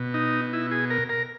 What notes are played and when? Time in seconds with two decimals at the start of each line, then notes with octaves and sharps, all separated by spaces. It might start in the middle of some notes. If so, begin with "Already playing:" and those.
Already playing: B2
0.14 D#4
0.53 E4
0.71 G#4
0.90 A#4
1.09 A#4